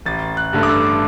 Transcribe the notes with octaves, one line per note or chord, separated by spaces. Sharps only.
A1 A6
F#6
G2 D3 A3
D6
E6